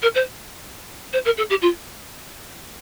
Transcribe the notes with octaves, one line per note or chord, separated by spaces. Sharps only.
A#4
C5
C5
A#4
A4
G4
F4